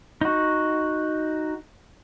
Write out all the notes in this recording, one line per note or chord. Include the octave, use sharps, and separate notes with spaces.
D#4 F#4